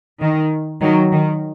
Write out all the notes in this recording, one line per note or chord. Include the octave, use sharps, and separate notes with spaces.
D#3
D#3 F#3
D#3